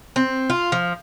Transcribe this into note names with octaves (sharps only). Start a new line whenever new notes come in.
C4
F4
F3